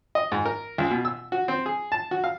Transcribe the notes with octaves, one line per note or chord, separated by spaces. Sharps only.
D#5
G#2
A#4
C#2
B2
E6
F#4
C4
G#4
A5
F#4
F5